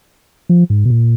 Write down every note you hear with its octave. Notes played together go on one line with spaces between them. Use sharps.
F3
G#2
B2
A#2